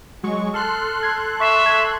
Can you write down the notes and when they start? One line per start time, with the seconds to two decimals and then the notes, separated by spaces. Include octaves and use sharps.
0.23 F#3 G#3 C#6
0.54 A4 C6 F6 F#6
1.03 G#6 C7
1.40 E5 C#6 B6 C7
1.66 G#6